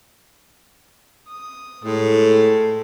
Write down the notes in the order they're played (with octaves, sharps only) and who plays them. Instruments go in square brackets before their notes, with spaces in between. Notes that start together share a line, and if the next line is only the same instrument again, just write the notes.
[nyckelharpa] D#6
[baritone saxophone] A2 [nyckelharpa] G#3 A4